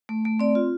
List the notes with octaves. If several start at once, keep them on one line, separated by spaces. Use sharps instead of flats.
A3
A3
C4 D5
F4